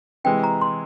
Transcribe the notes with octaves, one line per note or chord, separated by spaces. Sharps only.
C3 E3 G#3 G5
A#5
C6